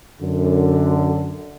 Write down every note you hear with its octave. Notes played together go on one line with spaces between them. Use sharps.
F#2 D3